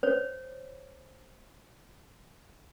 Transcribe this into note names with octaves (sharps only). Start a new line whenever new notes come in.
C5 C#5